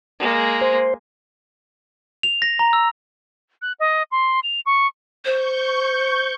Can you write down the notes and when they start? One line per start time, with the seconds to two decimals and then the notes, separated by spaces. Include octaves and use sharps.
0.20 G#3 A#3
0.61 C5
2.23 F7
2.42 A#6
2.59 A#5
2.73 E6
3.62 F#6
3.80 D#5
4.11 C6
4.43 F7
4.66 C#6
5.25 C5 C#6 G6